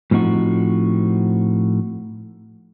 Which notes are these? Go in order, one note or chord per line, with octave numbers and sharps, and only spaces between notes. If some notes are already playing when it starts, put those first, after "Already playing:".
A2 F3 C4 D#4 F#4